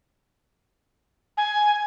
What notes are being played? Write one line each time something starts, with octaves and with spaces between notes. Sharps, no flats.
G#5